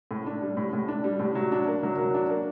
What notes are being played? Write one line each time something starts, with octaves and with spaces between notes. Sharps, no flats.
A2
D4
G3
A2
A2
D4
G3
A2
F#3
D4
A#3
F#3
F#3
D4
A#3